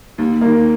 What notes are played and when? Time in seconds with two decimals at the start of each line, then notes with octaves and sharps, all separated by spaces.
0.18 D#2
0.41 D#3 A#3